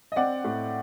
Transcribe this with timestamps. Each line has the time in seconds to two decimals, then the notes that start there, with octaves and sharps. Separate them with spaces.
0.12 D#5
0.16 C4 D5 F#5
0.44 A2